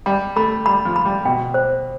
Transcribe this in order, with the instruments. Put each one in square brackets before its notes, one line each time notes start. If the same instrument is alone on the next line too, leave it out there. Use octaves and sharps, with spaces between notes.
[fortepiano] G3 [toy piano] B5
[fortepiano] A3 [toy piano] B5
[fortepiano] G3 [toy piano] B5
[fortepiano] F3
[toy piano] B5
[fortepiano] G3
[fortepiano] B2 [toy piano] G5
[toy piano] C5